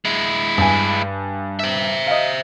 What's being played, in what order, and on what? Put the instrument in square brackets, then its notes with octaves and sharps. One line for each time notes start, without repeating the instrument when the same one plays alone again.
[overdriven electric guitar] G#3 E4
[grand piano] G2 G#5
[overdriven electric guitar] C5 E5
[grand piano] D#5 F5